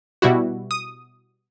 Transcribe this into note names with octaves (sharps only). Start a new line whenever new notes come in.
B2 G3 E4 F#4
D#6